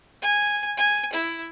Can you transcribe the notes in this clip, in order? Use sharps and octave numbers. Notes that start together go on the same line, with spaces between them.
G#5
G#5
E4